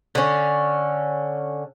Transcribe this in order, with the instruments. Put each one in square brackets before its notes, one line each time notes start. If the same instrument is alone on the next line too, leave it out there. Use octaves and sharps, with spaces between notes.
[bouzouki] D3 C#4